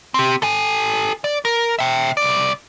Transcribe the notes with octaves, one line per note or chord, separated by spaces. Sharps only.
C4 G4
A4 G#5
D5
A#4
E5 G5
C2 D5